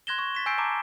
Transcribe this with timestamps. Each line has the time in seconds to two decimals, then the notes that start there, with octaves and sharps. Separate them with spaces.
0.07 C6 F#6 G#6 A#6 E7 G7
0.19 C#6
0.35 A6 B6 E7
0.46 G#5 E6 G6 A6 C7 D7
0.58 A5 A#5 D6